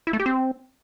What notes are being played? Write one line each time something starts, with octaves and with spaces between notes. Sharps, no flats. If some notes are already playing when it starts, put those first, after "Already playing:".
E4
A3
G4
C4